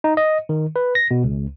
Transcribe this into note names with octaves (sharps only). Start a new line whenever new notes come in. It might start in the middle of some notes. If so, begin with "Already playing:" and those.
D#4
D#5
D#3
B4
A#6
B2
C#2